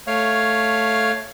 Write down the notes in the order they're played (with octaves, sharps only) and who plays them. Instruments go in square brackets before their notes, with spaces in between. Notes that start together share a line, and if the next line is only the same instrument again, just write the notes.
[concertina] A3 C#5 F5